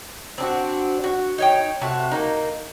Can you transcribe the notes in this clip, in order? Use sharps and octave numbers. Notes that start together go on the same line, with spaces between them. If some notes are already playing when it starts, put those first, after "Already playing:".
C4 D4 F#4
F#4
D#4 C#5 G5
C3 A3 F#4 A5
A#3 D#4